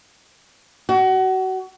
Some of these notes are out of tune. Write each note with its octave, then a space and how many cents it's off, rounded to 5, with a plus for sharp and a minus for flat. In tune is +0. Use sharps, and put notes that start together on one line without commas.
F#4 +30